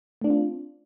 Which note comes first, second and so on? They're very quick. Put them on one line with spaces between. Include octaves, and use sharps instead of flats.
A3 D4 C4 F4